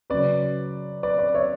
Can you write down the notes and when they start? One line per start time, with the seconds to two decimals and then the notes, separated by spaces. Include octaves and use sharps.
0.10 C#3 F#3 B4 D5
1.03 B4 D5
1.18 B4 D5
1.35 C#5 E5